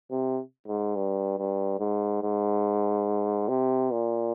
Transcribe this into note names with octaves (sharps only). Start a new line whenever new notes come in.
C3
G#2
G2
G2
G#2
G#2
C3
A#2